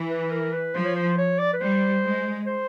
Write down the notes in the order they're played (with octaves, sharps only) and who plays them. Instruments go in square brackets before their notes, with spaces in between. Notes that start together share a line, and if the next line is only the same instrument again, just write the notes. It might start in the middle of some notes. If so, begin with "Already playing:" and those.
Already playing: [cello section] E3
[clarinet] B4
A#4
B4
[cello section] F3 [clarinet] C5
[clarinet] C#5
C5
C#5
D5
B4
[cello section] G3 [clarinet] C5
[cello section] G#3
[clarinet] C5